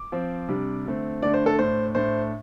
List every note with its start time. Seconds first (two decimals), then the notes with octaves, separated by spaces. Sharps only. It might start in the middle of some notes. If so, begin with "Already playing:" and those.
Already playing: D6
0.12 F3 C4
0.48 C3 G3 D4
0.86 D3 A3 C4
1.22 D3 A3 D4 D5
1.34 C5
1.46 A4
1.58 A2 A3 D4 C5
1.95 A2 A3 D4 C5